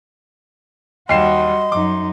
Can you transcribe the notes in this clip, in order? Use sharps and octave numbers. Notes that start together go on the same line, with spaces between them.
D#2 G3 F#4 D#5 C6 C7 E7
F#2 D#4 D6